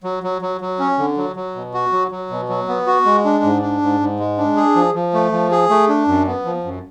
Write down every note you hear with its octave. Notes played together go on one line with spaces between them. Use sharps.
F#3
F#3
F#3
F#3
C#4
D3
F#3
F#3
B2
F#4
F#3
F#3
B2
F#3
B3
F#4
G#3
D4
G#2
D4
G#2
G#2
G#3
D4
G#4
F3
F3
A3
F3
G#4
A3
D4
F#2
B3
F3
F#2